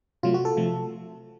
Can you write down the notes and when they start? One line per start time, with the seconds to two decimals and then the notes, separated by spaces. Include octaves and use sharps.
0.23 C3 F#3 A3 F4
0.34 F#4
0.45 A4
0.57 C3 F3 A3